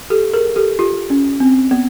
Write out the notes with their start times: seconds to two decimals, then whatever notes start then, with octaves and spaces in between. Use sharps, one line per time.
0.10 G4 A4
0.34 G#4 A#4
0.56 G4 A4
0.79 F4 G4
1.10 C#4
1.40 C4
1.71 B3